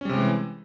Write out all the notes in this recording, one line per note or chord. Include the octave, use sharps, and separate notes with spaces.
C3 E3 G3 G#3 C#4